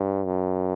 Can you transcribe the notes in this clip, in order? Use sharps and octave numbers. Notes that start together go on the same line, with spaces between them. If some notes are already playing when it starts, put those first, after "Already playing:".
Already playing: G2
F#2